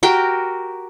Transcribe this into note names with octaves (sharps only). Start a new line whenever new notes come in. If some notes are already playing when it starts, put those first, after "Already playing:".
F#4 G4 A#4 G5